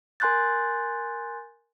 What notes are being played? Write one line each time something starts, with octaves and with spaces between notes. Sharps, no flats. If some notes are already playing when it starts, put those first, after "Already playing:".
A#4 G#5 C6 F#6 G6 A6